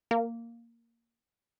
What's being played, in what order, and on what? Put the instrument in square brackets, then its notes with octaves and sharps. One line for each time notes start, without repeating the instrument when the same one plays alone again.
[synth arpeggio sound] A#3